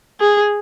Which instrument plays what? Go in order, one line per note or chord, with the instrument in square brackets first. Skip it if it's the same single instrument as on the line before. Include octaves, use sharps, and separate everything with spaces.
[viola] G#4